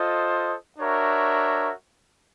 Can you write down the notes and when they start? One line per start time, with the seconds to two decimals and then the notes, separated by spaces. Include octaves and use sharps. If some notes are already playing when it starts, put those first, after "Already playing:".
Already playing: F4 A4 C5 D#5
0.78 D4 F#4 A#4 C#5 E5